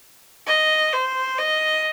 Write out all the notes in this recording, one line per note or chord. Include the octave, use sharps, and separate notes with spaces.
D#5
C5
D#5